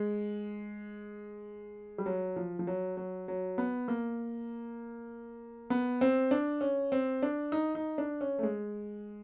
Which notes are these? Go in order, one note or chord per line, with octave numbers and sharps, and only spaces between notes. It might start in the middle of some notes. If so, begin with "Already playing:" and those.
Already playing: G#3
G3
F#3
F3
F3
F#3
F#3
F#3
B3
A#3
B3
C4
D4
C#4
C4
D4
D#4
D#4
D4
C#4
A3
G#3